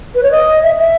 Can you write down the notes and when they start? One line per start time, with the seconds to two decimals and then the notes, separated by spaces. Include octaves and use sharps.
0.15 B4
0.23 C#5
0.31 D#5
0.63 E5
0.79 E5